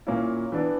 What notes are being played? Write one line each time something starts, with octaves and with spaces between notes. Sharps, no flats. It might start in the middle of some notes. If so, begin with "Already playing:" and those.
A#2 A#3 C#4 E4
E3 B3 D4